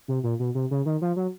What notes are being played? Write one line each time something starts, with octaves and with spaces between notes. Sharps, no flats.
C3
A#2
B2
C3
C#3
D#3
F3
F#3